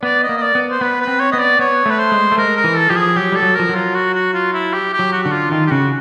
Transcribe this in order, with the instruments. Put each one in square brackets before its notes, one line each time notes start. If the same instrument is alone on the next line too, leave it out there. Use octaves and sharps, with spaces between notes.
[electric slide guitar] B3 [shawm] D5
[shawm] D#5
[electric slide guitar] A#3
[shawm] D#5
D5
[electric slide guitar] B3
[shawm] C5
[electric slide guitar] B3 [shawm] B4
[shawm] B4
[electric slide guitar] C4
[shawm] C#5
[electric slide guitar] B3 [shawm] D#5
[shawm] D5
[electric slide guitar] B3 [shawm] C#5
[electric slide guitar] A3 [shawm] B4
[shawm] C5
[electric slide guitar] G#3
A3
[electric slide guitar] G#3 [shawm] A#4
[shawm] A#4
[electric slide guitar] E3
[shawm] A4
[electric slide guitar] F3 [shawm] G4
[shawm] G#4
[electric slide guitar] F#3 [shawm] G4
[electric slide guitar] G3 [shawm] A4
[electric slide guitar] F#3
[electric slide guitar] F3 [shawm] A#4
[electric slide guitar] F#3
[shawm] F4
F#4
F#4
F4
E4
G4
G4
[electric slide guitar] F#3
[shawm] F#4
[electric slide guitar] D3 [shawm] F#4
[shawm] F4
[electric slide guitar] D#3 [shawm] F4
[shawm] G4
[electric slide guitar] C#3 [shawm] F#4